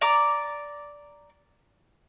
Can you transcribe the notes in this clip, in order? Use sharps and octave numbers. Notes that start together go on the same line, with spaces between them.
D5 A#5 D6